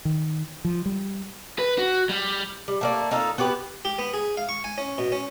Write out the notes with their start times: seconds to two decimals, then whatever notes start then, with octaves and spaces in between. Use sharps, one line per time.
0.05 D#3
0.65 F3
0.86 G3
1.59 B4
1.78 F#4
2.09 G3
2.68 G3
2.81 A3 A#3 D5
3.11 A#3 D#4 F4 A4
3.38 B3 F#4 G4 B4
3.85 G4
3.99 B3
4.14 G#4
4.37 F5
4.49 C#6
4.64 G#5
4.78 C#4
4.98 B2
5.12 C#4